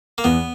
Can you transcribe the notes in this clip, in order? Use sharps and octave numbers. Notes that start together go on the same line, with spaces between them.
A#3
E2 B3